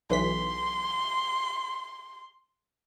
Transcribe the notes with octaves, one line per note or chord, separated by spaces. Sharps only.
B1 E3 C6 B6